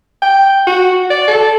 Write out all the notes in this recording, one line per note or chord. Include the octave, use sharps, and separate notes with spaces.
G5
F#4
D5
A4